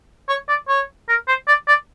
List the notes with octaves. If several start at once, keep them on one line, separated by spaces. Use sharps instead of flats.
C#5
D5
C#5
A#4
C5
D5
D5